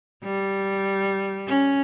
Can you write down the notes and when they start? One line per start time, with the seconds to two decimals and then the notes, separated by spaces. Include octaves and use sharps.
0.24 G3
1.47 C#4